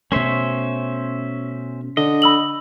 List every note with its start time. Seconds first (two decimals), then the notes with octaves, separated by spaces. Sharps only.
0.12 B2 A3 C#4 C5 E5
1.97 D3 D#5
2.22 B5 E6 F#7